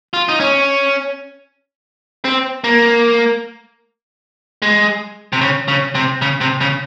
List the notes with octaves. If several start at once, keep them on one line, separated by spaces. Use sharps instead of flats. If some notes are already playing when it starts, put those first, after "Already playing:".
F4
D#4
C#4
C4
A#3
G#3
C3
C#3
C#3
C3
C#3
C3
C#3